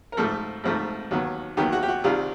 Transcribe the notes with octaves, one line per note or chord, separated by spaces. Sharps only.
A#4
G#1 G#2 F3 A3 A4
G#1 G#2 F3 A3
D#2 D#3 F#3 B3
D#2 D#3 F#3 B3 G4
F#4
G4
F#4
C2 C3 D#3 G3 F4